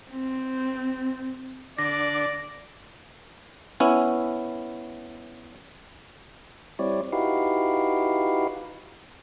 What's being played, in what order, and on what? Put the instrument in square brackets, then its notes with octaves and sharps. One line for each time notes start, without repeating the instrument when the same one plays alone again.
[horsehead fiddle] C4
[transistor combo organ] D3 D4 [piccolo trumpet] D5 [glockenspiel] A#6
[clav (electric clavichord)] B3 C#4 E4
[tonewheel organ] G3 C4 E4 C#5 D5
D#4 E4 F#4 G4 B4 F5